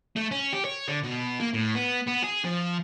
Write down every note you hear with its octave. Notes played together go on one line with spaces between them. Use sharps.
A3
C#4
G4
C#5
D3
B2
A#3
A2
B3
B3
G#4
F3